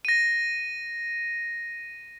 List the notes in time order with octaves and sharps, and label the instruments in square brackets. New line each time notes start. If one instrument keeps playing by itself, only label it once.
[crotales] A#6 D#7